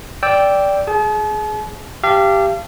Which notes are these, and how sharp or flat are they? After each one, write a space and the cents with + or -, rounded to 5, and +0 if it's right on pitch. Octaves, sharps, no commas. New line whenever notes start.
D5 -10 G5 +0 E6 +0
G#4 +15 A5 -45
G4 +0 F5 -35 A5 +0